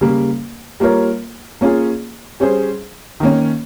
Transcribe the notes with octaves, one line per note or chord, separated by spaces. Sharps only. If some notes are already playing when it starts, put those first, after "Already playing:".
C#3 G3 A#3
G3 A#3 F4 A#4 C#5
A#3 C#4 F4 G#4
G3 C#4 G#4 C5
D#3 A#3 C#4